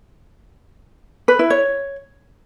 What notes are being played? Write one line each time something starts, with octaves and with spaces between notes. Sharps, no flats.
B4
E4
C#5